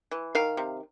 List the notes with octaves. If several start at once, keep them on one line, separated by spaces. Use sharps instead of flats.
E3
D#3 F5
C3